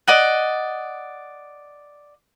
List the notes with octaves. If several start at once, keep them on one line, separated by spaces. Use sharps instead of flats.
D5 D#5 F#5